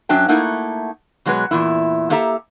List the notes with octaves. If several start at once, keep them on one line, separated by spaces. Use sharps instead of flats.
F#2 F#3 D4 E5 G5
A3 A#3 D#4 E4 F#5
B2 F#3 G#3 F#4 B4
E2 A#2 E4
A#3 G4 A4 E5 A#5